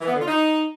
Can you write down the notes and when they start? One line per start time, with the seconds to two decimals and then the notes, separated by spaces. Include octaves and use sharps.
0.01 E3
0.07 B3
0.14 D3
0.21 F4
0.27 D#4